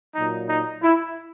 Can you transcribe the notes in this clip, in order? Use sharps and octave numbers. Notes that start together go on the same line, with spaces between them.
A#2 F#3 D#4
D#4
E4